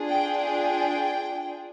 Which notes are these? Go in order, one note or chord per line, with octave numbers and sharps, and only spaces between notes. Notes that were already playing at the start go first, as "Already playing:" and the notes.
Already playing: D4 F4 G#4
G5
G5